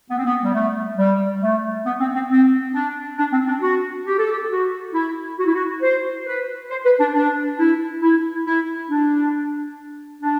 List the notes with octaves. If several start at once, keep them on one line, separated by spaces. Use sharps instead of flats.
B3
C4
B3
G3
A3
G3
A3
B3
C4
C4
C4
D4
D4
C4
D4
F#4
G4
A4
G4
F#4
E4
F#4
E4
F#4
C5
B4
C5
B4
D4
D4
E4
E4
E4
D4
D4